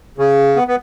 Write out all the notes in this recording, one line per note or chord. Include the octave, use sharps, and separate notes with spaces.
C#3
B3
B3